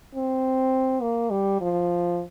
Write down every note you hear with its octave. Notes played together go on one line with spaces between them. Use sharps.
C4
A#3
G3
F3